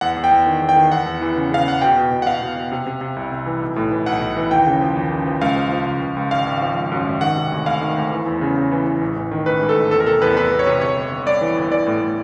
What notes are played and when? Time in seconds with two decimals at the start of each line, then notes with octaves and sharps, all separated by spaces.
0.01 E2 F#5
0.17 E2
0.24 G5
0.31 E2
0.47 D#3
0.62 E2
0.69 G5
0.76 D#3
0.92 E2 F#5
1.06 E2
1.21 E3
1.36 C#3
1.51 C#3 F5
1.66 E2 F#5
1.81 B2 G5
1.96 B2
2.12 B2
2.22 F#5
2.26 B2 F5
2.41 B2
2.56 B2
2.72 C3
2.86 C3
3.01 C3
3.16 C2
3.32 C2
3.46 E3
3.61 B1
3.76 A2
3.91 E3
4.06 B1 F#5
4.21 B1
4.37 E3
4.51 D#2 G5
4.66 C#3
4.81 F3
4.97 D#2
5.12 C#3
5.26 F3
5.41 C#2 F5
5.56 F3
5.72 F3
5.87 C#2
6.01 C#2
6.16 C#2
6.31 G#1 F5
6.46 G#1
6.61 F3
6.77 G#1
6.92 F#2
7.07 G#1
7.21 D#3 F#5
7.36 C3
7.52 D2
7.66 D2 F5
7.81 D#3
7.96 D2
8.12 E3
8.26 E2
8.41 C#3
8.56 C#3
8.71 E3
8.87 E3
9.01 A1
9.16 A1
9.31 D#3
9.46 A1 B4
9.62 G#2
9.69 A4
9.76 A1
9.91 E2 A4
10.00 A#4
10.06 C3 A4
10.21 E2 B4
10.37 E2 B4
10.51 E2
10.59 C#5
10.66 C3
10.81 G1 C#5
10.96 G1
11.11 G1
11.26 G2 D5
11.41 E3
11.57 G1
11.71 E3 D5
11.86 A2
12.01 A2